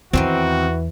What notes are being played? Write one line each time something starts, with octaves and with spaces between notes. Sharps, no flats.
E2 D#3 E3 A#3 C4 F#4